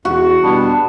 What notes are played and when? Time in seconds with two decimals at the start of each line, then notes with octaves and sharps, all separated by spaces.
0.05 E2 F#4
0.43 B2 G3 B3 D4